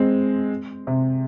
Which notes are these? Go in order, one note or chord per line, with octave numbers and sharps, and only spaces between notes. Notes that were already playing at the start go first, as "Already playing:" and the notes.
Already playing: G#3 C4
C3